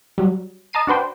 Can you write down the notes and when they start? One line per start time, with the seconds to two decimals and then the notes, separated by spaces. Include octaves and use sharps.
0.18 F#3 G3
0.73 D#5 A5 A#5 C7 D#7
0.87 D4 F#4 B4 C5 G5